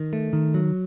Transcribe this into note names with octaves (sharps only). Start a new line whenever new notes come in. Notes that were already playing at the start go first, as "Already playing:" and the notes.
Already playing: D#3
A3
D#3
F#3